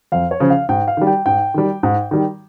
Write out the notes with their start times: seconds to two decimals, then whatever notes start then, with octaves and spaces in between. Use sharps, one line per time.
0.12 F2 F5
0.31 C#5
0.40 C#3 F3
0.50 F5
0.69 G#2 G5
0.88 F5
0.97 D#3 G3
1.07 G5
1.26 G#2 G5
1.54 D#3 G3
1.83 G#2
2.11 D#3 G3